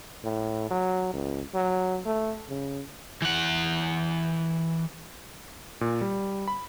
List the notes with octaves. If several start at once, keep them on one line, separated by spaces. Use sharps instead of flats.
A2
F#3
C#2
F#3
A3
C#3
E3 F#5
A#2
G3
B5